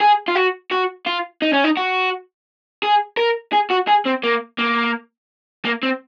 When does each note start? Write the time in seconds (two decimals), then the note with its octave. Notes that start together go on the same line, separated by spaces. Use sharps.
0.01 G#4
0.28 F4
0.35 F#4
0.71 F#4
1.06 F4
1.42 D#4
1.53 C#4
1.64 D#4
1.77 F#4
2.83 G#4
3.17 A#4
3.53 G#4
3.71 F#4
3.89 G#4
4.06 C4
4.24 A#3
4.58 A#3
5.65 A#3
5.83 C4